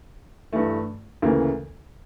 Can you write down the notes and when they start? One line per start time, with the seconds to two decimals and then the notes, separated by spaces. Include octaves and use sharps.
0.53 G2 E3 A3
1.22 D2 C#3 E3 A#3